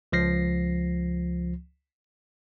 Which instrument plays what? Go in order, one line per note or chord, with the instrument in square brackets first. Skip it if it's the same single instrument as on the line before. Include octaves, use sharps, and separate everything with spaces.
[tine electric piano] C#2 F3 A#6 C7